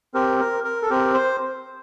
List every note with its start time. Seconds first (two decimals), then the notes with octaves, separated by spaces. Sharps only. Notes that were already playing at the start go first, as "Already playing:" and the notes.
0.14 C4 G4 A#4
0.40 A#4
0.64 A#4
0.82 A4
0.90 C4 G4 A#4
1.14 C5